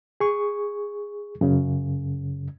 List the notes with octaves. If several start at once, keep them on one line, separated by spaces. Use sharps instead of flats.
G#4 C#6
F#2 C#3